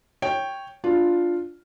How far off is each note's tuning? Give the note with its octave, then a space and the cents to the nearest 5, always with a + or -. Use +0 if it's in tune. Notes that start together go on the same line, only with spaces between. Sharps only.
C#5 -5 G5 +0
D4 +0 F4 +0